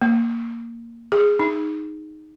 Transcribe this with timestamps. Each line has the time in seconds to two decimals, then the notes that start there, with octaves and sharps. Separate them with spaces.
0.02 A#3
1.12 G#4
1.39 D#4